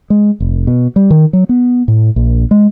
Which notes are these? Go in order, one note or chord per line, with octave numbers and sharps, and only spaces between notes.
G#3
F1
B2
G3
D#3
F#3
B3
A2
A#1
G#3